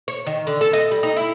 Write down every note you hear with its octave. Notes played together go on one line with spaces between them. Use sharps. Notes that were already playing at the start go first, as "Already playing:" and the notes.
C#5
D#3
D3
A4
D#5
G3
D#4
E4